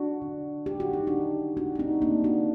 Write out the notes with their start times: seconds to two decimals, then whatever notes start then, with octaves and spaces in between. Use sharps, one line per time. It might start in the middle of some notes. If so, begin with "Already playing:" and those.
Already playing: D4 F#4
0.22 D3
0.66 D3 G4
0.80 F#4
0.93 D#4
1.07 D3 D4 F#4
1.57 A3 D4 F#4
1.76 D4
1.79 C4 D#4
2.02 A3 A#3 D4
2.24 D4 F#4